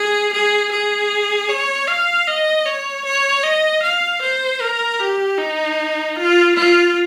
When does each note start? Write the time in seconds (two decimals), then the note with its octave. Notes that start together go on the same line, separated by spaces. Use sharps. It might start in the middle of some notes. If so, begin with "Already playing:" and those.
Already playing: G#4
0.33 G#4
0.72 G#4
1.49 C#5
1.88 F5
2.27 D#5
2.66 C#5
3.05 C#5
3.44 D#5
3.82 F5
4.22 C5
4.61 A#4
4.99 G4
5.38 D#4
6.17 F4
6.55 F4